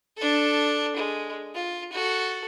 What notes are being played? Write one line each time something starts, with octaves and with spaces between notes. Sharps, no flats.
D4 A4
G#3
F4
F#4 A4